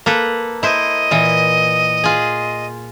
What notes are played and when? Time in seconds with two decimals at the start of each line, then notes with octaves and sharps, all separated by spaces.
0.06 A#3 A4 B4
0.63 E4 C5 D#5
1.11 A#2 E3
2.04 F4 G#4